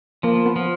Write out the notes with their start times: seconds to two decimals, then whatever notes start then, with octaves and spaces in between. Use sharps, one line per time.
0.23 F3 A#3
0.46 B3
0.56 F3